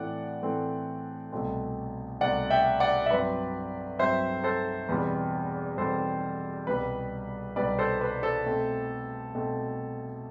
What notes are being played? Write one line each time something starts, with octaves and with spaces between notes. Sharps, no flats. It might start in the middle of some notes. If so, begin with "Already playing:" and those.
Already playing: A2 E3 A3 C4 D5 F#5
A2 E3 A3 C4
C2 B2 A3 C4
C2 B2 A3 C4 D5 F#5
E5 G5
D5 F#5
E5
G2 F#3 C4 B4 D5
G2 F#3 C4 C5 E5
A4 C5
E2 B2 G3 C4 B4
E2 B2 G3 C4 A4 C5
C2 B2 G3 B4
C2 B2 G3 B4 D5
A4 C5
B4
A4 C5
B2 A3 C4
B2 A3 C4